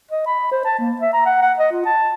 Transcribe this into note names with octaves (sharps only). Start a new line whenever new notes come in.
D#5
B5
C5
A5
A#3
E5
A#5
F#5
F#5
D#5
F4
A5